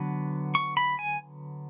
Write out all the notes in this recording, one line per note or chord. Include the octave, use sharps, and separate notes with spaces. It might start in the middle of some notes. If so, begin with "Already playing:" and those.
Already playing: D3 F#3 B3
C#6
B5
G#5